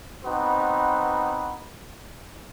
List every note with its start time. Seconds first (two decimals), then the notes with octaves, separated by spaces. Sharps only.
0.25 B3 C4 D#4 F#4 B4 C5